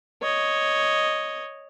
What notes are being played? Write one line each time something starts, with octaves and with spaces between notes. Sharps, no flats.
C#5 D#5